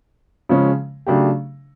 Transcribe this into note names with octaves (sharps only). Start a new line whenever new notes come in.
C#3 F3 G#3 C#4
C#3 F#3 A3 D4 G4